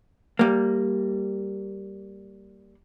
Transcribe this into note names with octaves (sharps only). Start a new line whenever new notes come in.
G3 A#3